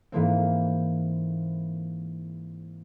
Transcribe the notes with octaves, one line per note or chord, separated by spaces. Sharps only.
G#2 E3 A#3 C4